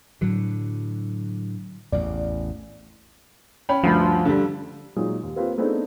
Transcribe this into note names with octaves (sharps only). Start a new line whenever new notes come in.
A2 D3 F#3
A1 E2 D5
C#4 G5 B5
D2 G2 F3 B5
D3 G3
A#2 F#3 G#3 D#4 D#6
D#2
A#3 C4 F4 G4 B4
A3 B3 C4 D4 D#4 G#4